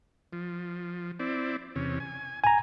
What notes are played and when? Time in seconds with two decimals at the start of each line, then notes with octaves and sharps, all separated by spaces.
0.33 F3
1.19 C4 E4 D5
1.76 E2 C3 C#4
2.00 G#5
2.44 G#5 A#5